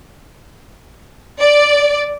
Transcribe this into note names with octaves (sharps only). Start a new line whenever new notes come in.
D5